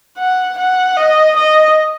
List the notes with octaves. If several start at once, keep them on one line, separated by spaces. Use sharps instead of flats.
F#5
F#5
D#5
D#5